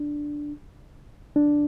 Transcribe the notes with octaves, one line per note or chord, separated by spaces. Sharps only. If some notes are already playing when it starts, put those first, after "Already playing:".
Already playing: D4
D4